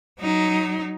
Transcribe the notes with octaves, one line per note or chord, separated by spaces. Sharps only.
F#3 D#4